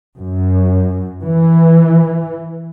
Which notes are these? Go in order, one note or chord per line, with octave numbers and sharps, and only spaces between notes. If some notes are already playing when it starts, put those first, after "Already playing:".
F#2
E3